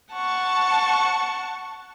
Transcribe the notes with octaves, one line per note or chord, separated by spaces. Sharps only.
F#5 A5 C#6